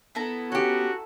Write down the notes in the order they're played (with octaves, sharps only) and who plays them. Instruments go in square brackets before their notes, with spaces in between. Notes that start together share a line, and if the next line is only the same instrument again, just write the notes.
[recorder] B3 [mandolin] E4 A4 A#5
[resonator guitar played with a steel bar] C#4 G4 [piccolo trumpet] F#4